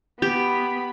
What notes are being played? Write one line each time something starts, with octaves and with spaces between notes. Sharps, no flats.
B3 G4 B5